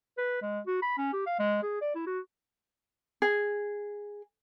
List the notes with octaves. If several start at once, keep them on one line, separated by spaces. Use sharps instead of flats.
B4
G#3
F#4
B5
C#4
G4
F5
G#3
G#4
D5
E4
F#4
G#4